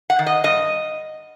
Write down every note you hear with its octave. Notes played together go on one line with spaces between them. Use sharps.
F#5
D#3
D#5
G2 D#5